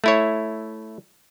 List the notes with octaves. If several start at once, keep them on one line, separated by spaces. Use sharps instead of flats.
A3 E4 C#5